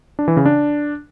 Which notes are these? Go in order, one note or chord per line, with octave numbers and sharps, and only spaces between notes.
D4
E3
C#3
D4